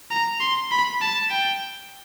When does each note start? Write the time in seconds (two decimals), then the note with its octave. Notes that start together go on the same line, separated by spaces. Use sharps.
0.11 A#5
0.40 C6
0.71 B5
1.01 A5
1.30 G5